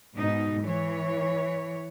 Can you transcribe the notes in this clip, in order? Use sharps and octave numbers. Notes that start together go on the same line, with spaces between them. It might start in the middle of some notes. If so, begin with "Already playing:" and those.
G#2 B2 D#4
E3 C#5